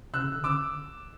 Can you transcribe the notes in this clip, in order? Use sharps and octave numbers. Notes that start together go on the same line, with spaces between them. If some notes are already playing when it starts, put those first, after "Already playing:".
C3 E6 F#6
C#3
D3
D6 E6